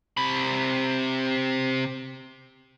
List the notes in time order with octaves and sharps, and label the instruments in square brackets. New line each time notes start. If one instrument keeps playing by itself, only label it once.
[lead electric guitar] C3 B5